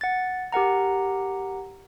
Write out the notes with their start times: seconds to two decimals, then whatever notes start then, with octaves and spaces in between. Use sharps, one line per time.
0.01 F#5 A6
0.52 G4 A#4 F#5 A#5